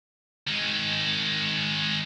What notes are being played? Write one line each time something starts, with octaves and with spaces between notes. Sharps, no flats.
D#3 G#3